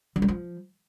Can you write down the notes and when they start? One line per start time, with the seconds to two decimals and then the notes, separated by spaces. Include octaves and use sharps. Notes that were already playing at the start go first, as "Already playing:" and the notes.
0.16 E3
0.22 G3
0.28 F3